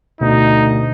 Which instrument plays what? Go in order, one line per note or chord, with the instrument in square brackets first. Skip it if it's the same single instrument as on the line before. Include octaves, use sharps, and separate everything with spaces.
[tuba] D2 [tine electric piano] B2 [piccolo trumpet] D#4